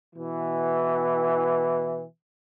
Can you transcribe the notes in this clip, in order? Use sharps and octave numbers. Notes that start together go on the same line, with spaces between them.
B2 E3